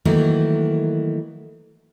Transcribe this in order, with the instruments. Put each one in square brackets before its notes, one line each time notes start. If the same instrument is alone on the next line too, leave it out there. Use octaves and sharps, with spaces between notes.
[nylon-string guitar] D#3 E3 F#3 A3 A#3 D#4